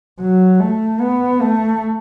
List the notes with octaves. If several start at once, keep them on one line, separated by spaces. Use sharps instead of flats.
F#3
A3
B3
A3